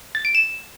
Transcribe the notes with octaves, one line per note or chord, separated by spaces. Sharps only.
A6
D7
E7